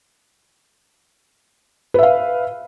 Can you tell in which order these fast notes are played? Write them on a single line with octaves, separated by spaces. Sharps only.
B4 E5 F5